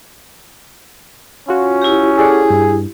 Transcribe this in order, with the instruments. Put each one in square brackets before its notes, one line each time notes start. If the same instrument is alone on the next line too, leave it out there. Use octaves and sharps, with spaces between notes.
[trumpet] C#4 [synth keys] F4 F#4
[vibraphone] E4 G4
[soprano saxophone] G#4 [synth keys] A4 D5 F#5
[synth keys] G2